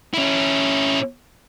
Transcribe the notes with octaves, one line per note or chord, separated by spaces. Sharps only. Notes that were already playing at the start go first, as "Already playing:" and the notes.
C#4 E4